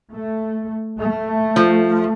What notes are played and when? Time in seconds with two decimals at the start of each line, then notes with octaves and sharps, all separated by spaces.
0.11 A3
0.99 A3
1.56 F3